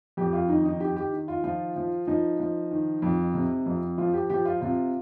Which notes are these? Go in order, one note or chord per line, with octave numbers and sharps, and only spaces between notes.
F2 G4
F4
D#3 D#4
D#4
D#3 G4
G4
D#3
F4
F3 F4
F3
F3 D#4
F3
D#3
F2
C3
F2
F3 F4
G4
F3 G4
F4
C3 F4